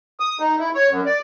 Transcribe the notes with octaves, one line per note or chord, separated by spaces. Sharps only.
D#6
D#4
E4
C#5
F#2
D5